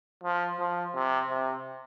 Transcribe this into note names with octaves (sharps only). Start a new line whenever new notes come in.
F3
F3
C3
C3